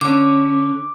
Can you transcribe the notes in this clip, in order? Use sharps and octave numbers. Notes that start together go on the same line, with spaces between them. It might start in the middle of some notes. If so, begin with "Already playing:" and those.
D3 C#4 D6